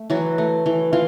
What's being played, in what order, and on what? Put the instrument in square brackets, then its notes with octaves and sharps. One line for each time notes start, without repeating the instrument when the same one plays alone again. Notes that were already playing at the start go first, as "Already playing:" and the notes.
Already playing: [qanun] A3
E3 F#3 F#4
A3
E3
E3 F4